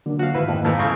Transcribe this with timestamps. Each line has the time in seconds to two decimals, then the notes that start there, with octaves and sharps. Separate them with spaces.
0.06 D3 F#3 A#3 D4
0.19 F#4 F5
0.35 G#2 D#3 E4 B4 E5
0.49 F2 A#3
0.64 A2 E3 A3 F5 A#5 F6
0.79 C#3 C4 G#6